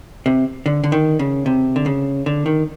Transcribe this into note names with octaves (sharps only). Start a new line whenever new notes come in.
C3
D3
D3
D#3
C#3
C3
D3
C#3
D3
D#3